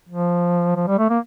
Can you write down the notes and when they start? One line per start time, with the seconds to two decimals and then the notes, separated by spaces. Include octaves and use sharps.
0.09 F3
0.76 F3
0.87 G3
0.98 A3
1.10 A#3